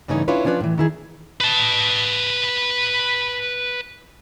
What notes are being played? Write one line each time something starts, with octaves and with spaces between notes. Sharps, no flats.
G2 C#3 E3 A3 C#4 D#4
C#4 D4 E4 F4 B4 C#5
F3 C#4 D4 F4 B4 D5
A2 E3
D#3 E4 G#4
B4 A5